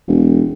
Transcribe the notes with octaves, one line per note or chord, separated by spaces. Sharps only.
E1